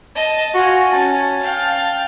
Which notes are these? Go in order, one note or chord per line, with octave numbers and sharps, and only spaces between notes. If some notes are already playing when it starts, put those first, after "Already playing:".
D#5 A5
F4 F#4 G#5
C#4 A5
F5 G5